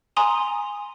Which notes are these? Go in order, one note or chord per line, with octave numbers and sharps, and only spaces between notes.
G#5 A#5 C6 D#6 F7